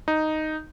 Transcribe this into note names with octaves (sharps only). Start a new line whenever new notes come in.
D#4